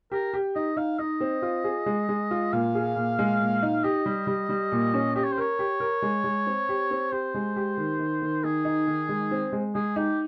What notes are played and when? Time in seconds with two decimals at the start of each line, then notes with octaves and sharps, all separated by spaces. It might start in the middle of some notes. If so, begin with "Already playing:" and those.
0.12 G4 A#4
0.34 G4
0.55 D#4 D#5
0.77 D#4 F5
0.99 D#4 D#5
1.20 C4
1.42 F4
1.64 G#4
1.86 G#3
2.09 G#3
2.31 F4
2.53 A#2 F5
2.75 G#4
2.96 A#2
3.19 G#3
3.41 A#2
3.62 D#4
3.84 G4 D#5
4.06 G3
4.27 G3
4.49 G3
4.72 A#2
4.94 C#4
5.15 G4 D#5
5.24 C#5
5.32 C5
5.38 A#4 C#5
5.59 G4
5.80 A#4
6.02 G#3
6.24 G#3
6.47 C4
6.69 G4
6.91 C4
7.12 G4 C5
7.34 G#3
7.56 G4
7.77 D#3
7.99 D#3
8.22 D#3
8.44 D#3 G#4
8.65 D#4
8.87 D#3
9.09 G#3
9.31 C4
9.53 G#3
9.75 G#3 G#4
9.96 D#4 G4